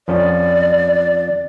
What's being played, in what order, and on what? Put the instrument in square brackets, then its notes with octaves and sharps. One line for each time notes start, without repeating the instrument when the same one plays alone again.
[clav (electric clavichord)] F2 F3 C#4 [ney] D5